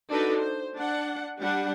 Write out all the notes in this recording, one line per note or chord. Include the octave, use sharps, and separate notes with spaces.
D4 D#4 F#4 A4 B4
C5
D4 F#5
G3 D4 G4 F#5